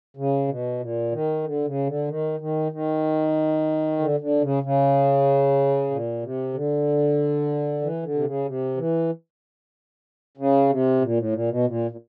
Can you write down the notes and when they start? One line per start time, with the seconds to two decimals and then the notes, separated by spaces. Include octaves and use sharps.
0.17 C#3
0.48 B2
0.80 A#2
1.12 D#3
1.44 D3
1.65 C#3
1.87 D3
2.08 D#3
2.40 D#3
2.72 D#3
3.99 D3
4.20 D3
4.42 C#3
4.63 C#3
5.90 A#2
6.23 C3
6.54 D3
7.82 E3
8.03 D3
8.14 C3
8.24 C#3
8.46 C3
8.77 E3
10.37 C#3
10.69 C3
11.02 A#2
11.17 A2
11.33 A#2
11.49 B2
11.65 A#2
11.91 A#2